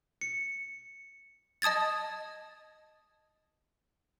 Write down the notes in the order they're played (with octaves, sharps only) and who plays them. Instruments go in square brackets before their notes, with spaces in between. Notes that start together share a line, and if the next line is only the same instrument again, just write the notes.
[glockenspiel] C#7
[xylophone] D#5 A5 D#6 G#6 A6